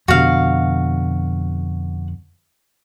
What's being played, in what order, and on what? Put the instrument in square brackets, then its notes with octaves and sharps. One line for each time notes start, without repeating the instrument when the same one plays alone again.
[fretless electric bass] F2 B2 D3 [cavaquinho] F#4 F5